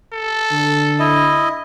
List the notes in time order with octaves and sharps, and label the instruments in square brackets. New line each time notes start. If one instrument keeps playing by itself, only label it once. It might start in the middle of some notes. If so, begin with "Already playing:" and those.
[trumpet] A4
[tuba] D3
[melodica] E4 D#5